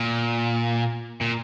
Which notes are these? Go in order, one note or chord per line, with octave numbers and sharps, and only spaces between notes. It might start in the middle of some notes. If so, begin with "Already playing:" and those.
Already playing: A#2
A#2